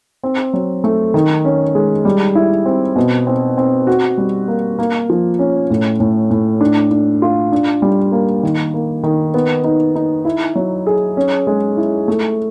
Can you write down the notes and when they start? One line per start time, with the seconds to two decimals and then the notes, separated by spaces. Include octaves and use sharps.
0.23 C4
0.53 F#3
0.84 A3
1.14 D#3
1.45 C#4
1.75 G#3
2.05 G3
2.35 E4
2.66 C4
2.96 B2
3.27 C4
3.57 C4
3.87 F#4
4.18 G3
4.48 A#3
4.79 A#3
5.10 F3
5.39 C#4
5.70 A2
6.00 A2
6.31 A2
6.61 D4
6.91 D4
7.22 F4
7.52 D4
7.82 G3
8.12 A#3
8.43 D#3
8.74 A#3
9.03 D#3
9.34 B3
9.64 D#4
9.96 D#4
10.25 E4
10.55 F#3
10.87 G#4
11.17 C#4
11.47 G#3
11.77 E4
12.08 A3